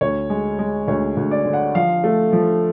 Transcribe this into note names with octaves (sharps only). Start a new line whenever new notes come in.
D2 C#5
G#3
G#3
D2 C#5
D2
D5
D3
F#5
F3 F5
A3
F3